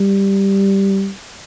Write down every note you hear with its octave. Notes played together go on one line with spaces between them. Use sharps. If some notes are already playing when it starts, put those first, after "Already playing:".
Already playing: G3